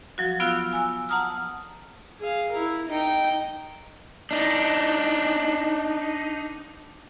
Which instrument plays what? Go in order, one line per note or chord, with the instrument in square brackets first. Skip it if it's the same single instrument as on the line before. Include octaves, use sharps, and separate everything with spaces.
[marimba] F3 F#3 F#4
B3 F4 F5 E6 F#6
G#5 E6
F#5 A5 A#5 D#6 F6
[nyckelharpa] G#4 F5
E4 A#4
D#4 G5
[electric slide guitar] D4 D#4